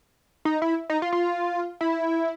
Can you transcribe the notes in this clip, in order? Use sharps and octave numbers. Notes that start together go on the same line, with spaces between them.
D#4
E4
D#4
F4
F4
E4